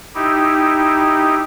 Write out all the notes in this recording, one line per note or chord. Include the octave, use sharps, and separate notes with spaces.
D#4 E4 G4